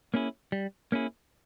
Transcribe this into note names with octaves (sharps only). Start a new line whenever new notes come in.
A#3 C#4 E4 G#4
G3
A#3 C#4 E4 G#4